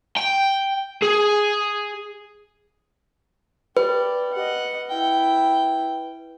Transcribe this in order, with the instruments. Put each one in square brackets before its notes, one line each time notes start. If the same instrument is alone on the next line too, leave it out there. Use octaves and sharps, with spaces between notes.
[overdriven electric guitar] G5
G#4
[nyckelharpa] G4 D5 [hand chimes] B4
[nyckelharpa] D#5 F#5
E4 G5